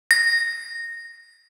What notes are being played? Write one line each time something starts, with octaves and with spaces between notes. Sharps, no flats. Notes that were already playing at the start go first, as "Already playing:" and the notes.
A#6